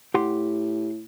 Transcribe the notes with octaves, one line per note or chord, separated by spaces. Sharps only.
A2 G4 F#5 C6